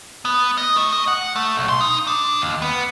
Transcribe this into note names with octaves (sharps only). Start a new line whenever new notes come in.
B3
D#5
A3
D#5
F#5
A3
B1
C6
D#4
D4
D#2
B3